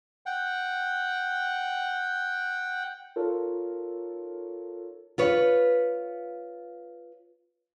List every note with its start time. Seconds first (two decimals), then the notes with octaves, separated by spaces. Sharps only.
0.26 F#5 G5
3.16 D#4 F4 A4 A#4 C#5
5.18 F4 B4 C#5